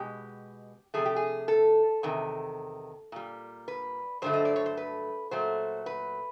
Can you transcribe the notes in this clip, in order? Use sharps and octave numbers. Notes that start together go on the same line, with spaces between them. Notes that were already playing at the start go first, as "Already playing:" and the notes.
Already playing: B2 G#3 G4
C3 F3 A3 G#4
G4
G#4
A4
E2 C3 D#3
A#2 G3
B4
G2 D3 F#3 A3 C5
D#5
D5
C#5
C5
B4
A#2 F#3 A3 C5
B4